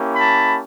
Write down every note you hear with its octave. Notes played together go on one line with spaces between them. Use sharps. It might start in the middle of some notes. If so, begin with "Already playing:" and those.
Already playing: A#3 C#4 E4 G4
A5 B5